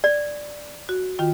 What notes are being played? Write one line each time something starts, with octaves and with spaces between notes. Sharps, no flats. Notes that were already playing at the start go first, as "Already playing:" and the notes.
D5
F#4
D#3 F4 G5